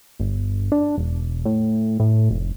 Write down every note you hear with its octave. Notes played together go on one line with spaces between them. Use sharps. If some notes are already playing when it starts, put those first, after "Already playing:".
G1
D4
E1
A2
A2
F1